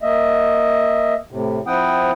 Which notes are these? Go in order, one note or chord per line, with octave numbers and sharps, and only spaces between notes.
A#3 D#5 E5
A2 C3
F3 C4 E4 F#5 G5 D#6